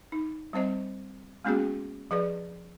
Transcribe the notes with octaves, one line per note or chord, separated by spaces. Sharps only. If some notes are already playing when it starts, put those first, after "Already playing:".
D#4
G3 C4 C5 D#5
G#3 A#3 B3 C#4 F#4 G#4
F3 G#4 B4 D5